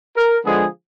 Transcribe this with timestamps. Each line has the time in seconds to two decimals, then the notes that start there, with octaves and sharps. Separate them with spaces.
0.16 A#4
0.44 D3 F3 G#3 B3 G#4